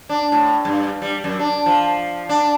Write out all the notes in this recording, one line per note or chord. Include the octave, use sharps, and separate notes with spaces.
D4
A2
G2
G3
F#2
D4
F3
D4